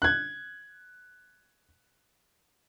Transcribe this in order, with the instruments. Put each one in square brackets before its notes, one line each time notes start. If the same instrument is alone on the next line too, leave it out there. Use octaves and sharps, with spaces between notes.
[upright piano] F#6 G#6